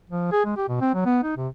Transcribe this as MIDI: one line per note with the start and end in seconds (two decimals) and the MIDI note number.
0.10 0.27 53
0.32 0.45 68
0.45 0.55 56
0.57 0.66 67
0.68 0.79 47
0.81 0.94 60
0.94 1.04 54
1.05 1.22 59
1.23 1.35 63
1.37 1.48 48